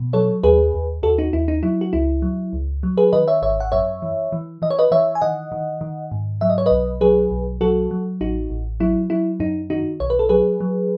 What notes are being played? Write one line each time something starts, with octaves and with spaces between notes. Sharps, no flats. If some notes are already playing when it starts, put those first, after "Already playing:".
Already playing: B2
F#3 A4 C#5
D#2 G#4 B4
D#2
D#2 F#4 A4
D#4 F#4
D#2 E4
D#4
F#3 E4
F#4
C#2 E4
F#3
C#2
F#3
G#4 B4
D#3 B4 D#5
C#5 E5
G#1 C#5 E5
F#5
F#2 C#5 E5
E3
E3
E3 D#5
C#5
B4 D#5
E3 C#5 E5
G#5
D#3 D#5 F#5
D#3
D#3
G#2
F#3 E5
D#5
C#5
B1 B4 D#5
F#3 G#4 B4
B1
F#3 F#4 A4
F#3
A1 D#4 F#4
A1
F#3 E4
F#3 E4
F#2 D#4
D#3 D#4 F#4
B1 C#5
B4
A4
F#3 G#4 B4
F#3